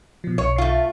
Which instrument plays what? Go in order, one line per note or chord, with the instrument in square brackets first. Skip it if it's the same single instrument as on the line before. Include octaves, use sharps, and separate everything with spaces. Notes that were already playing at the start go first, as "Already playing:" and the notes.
[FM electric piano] B2 F3
[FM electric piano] B1 [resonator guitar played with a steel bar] C#5
[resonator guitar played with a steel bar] A3 F4